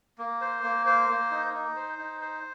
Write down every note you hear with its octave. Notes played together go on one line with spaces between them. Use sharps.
A#3
C5
A#3
C5
A#3
D#4
D#4
C5
D#4
C5